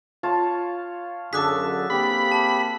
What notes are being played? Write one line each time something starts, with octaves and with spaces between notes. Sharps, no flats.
F4 C#5 A5
F#2 D3 G#4 A4 D6 F#6 B6
A#3 C4 G4 B5
A5